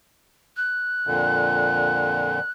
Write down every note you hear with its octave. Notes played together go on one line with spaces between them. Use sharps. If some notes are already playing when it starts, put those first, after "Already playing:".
F#6
F2 A#2 D3